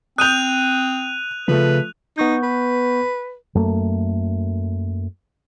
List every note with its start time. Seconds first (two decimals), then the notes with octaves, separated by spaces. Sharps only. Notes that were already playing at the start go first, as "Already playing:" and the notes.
0.18 C4 D#6 F#6 G6 D#7 F7
1.48 C#3 F3 A3 B4
2.18 B3 D#4 C#6 G6
2.43 B4
3.55 F#2 A3 A#3